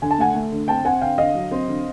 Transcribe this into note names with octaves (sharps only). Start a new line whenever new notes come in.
D3 G#5
A5
A3 F#5 G#5
A3
D3
C4 G5 A5
C4 F#5 G#5
D3 F5 G5
D3 D#5 F5
F#3
C4
D3